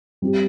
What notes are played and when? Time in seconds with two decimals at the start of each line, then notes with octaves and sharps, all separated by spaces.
0.22 G3 C4 G4